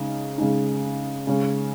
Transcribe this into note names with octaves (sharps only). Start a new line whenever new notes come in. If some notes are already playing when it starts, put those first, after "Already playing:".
Already playing: C#3 G#3 D#4
C#3 G#3 D#4
C#3 G#3 C#4